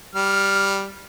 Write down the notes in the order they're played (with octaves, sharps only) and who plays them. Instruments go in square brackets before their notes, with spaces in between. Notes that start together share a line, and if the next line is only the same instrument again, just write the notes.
[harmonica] G3 F6